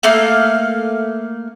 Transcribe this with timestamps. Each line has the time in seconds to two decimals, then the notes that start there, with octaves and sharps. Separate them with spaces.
0.03 A3 A#3 F5